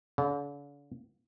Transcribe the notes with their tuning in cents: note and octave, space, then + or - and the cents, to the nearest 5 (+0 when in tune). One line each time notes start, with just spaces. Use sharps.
D3 -45